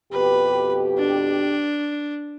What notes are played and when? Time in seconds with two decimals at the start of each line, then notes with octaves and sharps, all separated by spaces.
0.12 F2 B2 G4 B4
0.98 D4